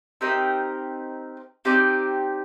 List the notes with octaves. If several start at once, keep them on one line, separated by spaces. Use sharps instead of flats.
C4 D#4 G4 A#4
C4 D#4 G4 D5